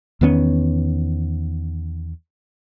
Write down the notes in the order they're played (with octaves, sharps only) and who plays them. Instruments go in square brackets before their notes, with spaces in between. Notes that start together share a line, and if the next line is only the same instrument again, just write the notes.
[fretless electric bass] E2 D#3 B3 C#4